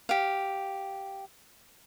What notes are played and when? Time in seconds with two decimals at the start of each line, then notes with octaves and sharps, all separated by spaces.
0.09 G4 F5